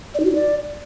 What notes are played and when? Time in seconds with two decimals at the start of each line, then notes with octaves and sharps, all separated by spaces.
0.15 D5
0.20 D#4
0.25 F#4
0.30 D#4
0.35 D5